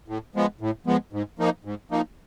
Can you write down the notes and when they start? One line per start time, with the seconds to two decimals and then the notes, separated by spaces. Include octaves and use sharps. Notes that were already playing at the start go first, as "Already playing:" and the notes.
0.08 A2
0.35 F3 G#3 B3
0.61 A2
0.86 F3 G#3 B3
1.13 G#2
1.39 F3 A#3 D#4
1.65 G#2
1.91 F3 A#3 D#4